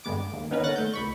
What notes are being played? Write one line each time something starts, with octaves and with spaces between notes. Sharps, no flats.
G2 D3 G#3 B3 D6 D7
D#2
D#3 B3 C#4 D#4 A#4 B4
D3 C#4 F#5 F#6 A6 A#6
A3 G6
C#2 B5 C#6